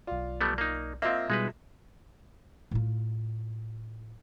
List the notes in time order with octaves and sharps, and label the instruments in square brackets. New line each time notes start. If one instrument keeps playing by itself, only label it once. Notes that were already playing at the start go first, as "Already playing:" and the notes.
[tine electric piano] B1 D5 [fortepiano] F4
[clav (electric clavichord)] G3 A3 B3
A#3 D#4
[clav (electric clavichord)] A#3 C4 [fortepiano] F4 D#5 E5
[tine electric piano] B2 G3 G#4 [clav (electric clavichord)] G#3 D#4 B4
[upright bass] A2 F4